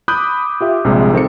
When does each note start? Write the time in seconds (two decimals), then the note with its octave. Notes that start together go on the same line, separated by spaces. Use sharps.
0.08 B5 D6 D#6 F#6 G6
0.61 F4 G4 E5
0.84 A#1 C3 G3 G#3
1.13 D#3 C4 A4 C#7